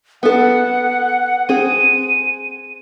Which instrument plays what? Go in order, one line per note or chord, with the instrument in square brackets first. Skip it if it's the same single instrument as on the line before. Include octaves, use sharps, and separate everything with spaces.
[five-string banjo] B3 A4 [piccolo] F#5
[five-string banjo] C4 G#4 [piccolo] D#7